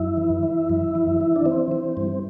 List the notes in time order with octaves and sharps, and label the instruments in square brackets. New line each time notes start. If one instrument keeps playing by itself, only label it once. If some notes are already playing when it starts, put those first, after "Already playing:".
Already playing: [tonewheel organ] F#2 E4
E3
E3
F#2
E3
E3
D4
E3 C4
E3
G2